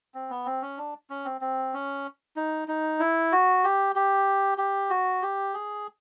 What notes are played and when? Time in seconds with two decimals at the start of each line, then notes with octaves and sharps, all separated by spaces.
0.15 C4
0.30 B3
0.46 C4
0.62 C#4
0.77 D4
1.10 C#4
1.25 C4
1.41 C4
1.74 C#4
2.36 D#4
2.68 D#4
3.00 E4
3.32 F#4
3.64 G4
3.96 G4
4.58 G4
4.90 F#4
5.22 G4
5.54 G#4